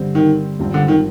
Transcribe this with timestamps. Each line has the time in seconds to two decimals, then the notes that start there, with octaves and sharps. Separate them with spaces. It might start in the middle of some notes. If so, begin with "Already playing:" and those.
Already playing: G2 D3 G3 C4
0.15 D#3
0.59 G#1 G2 F3 C4
0.74 D3
0.88 D#3